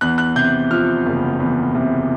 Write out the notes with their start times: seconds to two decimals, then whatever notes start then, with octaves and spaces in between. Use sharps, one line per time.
0.01 E2 F#6
0.18 F#6
0.35 C3 G6
0.71 F3 F6
1.06 F#1
1.40 E2
1.75 C3